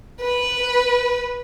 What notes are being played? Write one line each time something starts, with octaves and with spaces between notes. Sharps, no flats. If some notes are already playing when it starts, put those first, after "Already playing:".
B4